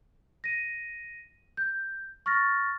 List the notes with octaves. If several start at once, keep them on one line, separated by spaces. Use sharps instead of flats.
A#6 D#7
G6
C#6 F6 A6 A#6